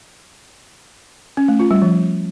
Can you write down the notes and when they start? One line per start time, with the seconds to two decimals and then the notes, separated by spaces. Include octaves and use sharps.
1.37 C#4
1.48 A3
1.60 F4
1.71 G3
1.82 F3